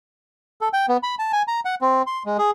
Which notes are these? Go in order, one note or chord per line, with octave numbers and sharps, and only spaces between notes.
A4
G5
B3
B5
A5
G#5
A#5
F#5
C4
C6
G#3
G#4